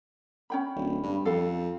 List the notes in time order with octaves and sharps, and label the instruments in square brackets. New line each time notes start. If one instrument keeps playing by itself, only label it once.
[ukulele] C#4 G5 B5
[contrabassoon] D1
G2
[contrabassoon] F2 [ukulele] A4 F5